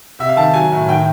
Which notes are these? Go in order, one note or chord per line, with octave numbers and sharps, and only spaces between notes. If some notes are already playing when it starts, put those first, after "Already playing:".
C3 E5
F5
D#3 A5
F#3 G#5
A2
D#3 G5